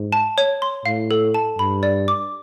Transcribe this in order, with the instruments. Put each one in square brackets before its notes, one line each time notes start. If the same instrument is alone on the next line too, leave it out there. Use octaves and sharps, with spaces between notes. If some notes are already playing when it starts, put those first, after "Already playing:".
Already playing: [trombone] G#2
[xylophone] A5
C#5
C6
[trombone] A2 [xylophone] F5
[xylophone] A4
A5
[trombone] G2 [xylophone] B5
[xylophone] D5
D6